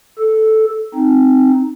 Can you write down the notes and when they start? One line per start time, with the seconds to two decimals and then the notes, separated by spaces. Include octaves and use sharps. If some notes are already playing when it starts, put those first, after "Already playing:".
0.19 A4
0.95 C4 D#4